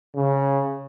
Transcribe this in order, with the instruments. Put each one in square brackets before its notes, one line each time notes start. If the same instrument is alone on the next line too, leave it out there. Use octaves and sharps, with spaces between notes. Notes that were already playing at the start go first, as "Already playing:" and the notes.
[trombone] C#3